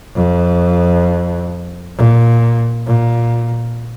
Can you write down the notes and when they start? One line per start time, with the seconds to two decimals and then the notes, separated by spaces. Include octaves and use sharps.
0.15 F2
1.96 A#2
2.86 A#2